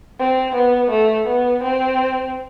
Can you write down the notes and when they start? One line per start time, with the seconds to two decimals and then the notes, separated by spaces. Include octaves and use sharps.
0.19 C4
0.55 B3
0.91 A3
1.27 B3
1.63 C4